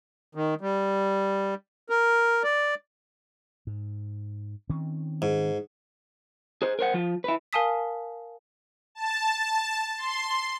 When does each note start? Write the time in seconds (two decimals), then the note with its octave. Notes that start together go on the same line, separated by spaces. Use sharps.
0.35 D#3
0.61 G3
1.90 A#4
2.44 D5
3.67 G#2
4.70 D#3 C4 C#4
5.22 G#2
6.62 G#4 C5
6.79 A#4 C5 F#5
6.94 F3 F4
7.24 E4 B4
7.53 A#4 F5 G#5 A5 D#6 B6
8.95 A5
9.98 C6